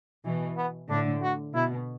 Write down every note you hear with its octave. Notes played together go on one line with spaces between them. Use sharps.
B2 E3
B3
A2 D3 D4
F#4
B2 E4